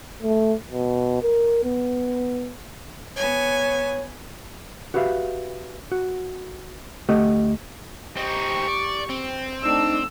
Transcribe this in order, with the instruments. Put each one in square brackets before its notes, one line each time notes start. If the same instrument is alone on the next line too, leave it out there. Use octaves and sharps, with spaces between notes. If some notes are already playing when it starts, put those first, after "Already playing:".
[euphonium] A3
B2
A#4
B3
[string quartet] B3 G#5 [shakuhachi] C#5
[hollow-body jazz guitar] F#4 G4 B4 E5 F5
F#4
D2 A3 G4 A4 D#5 F#5
[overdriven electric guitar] C4 D#4 [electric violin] G4 C#6
[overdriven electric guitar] D5
C4
[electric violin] A3 [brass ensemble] D4 D#4 [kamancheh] E6